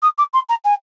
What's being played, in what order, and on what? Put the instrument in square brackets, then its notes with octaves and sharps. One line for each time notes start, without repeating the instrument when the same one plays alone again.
[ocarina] D#6
D6
C6
A#5
G#5